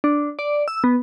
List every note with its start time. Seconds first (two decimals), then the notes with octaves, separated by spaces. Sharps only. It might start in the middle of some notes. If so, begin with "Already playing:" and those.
0.04 D4
0.39 D5
0.68 E6
0.84 B3